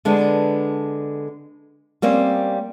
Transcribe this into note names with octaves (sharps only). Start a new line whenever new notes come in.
D3 G#3 B3 D4
G3 A#3 C4 C#4